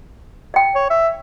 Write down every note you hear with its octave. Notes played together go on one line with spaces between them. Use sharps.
D#5 G5
C#5
E5